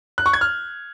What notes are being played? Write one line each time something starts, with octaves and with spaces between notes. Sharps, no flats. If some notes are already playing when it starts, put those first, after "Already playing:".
F#6
C#6
G#6
F6